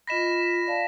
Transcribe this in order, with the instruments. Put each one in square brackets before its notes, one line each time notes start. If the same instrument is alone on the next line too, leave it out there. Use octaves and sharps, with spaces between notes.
[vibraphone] F4 D#5 B5 [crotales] A#6 B6 E7
[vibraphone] D5 F5 A5